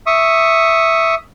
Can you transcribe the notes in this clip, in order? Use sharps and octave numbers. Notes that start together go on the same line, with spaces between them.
E5 C#6 D#6